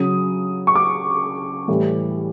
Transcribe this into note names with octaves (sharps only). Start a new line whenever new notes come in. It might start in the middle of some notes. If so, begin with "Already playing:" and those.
Already playing: C#3 F#3 D#6
C#6
D6
A2 E3 G3